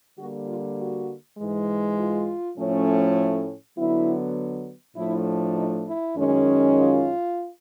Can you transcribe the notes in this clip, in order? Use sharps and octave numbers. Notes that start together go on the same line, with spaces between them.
D3 G3 A#3 F#4
F4
F#4
G#2 E3 G#3
F4
A2 F3 A3 C#4
D3 F#3 B3 E4
A2 F3 A3 D4 E4
D#4
E4
F#2 D#3 G#3 C#4
F4